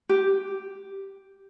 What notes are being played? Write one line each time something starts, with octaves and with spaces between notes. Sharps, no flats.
G4